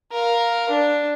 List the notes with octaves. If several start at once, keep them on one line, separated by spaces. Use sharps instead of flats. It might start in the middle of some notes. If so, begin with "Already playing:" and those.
A#4 F5
D4